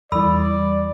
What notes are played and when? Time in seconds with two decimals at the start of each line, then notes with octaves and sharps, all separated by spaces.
0.12 E2 E3 G3 A4 D5 B5 E6